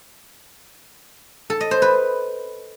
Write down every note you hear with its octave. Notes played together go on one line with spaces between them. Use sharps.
A4
D#5
C5
B4